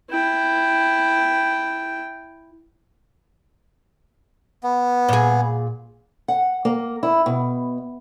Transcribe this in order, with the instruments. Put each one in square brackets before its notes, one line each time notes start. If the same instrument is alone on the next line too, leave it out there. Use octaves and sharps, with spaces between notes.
[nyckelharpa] E4 G5
[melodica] B3
[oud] A#2 G#4
[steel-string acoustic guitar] F#5
A#3
E4
B2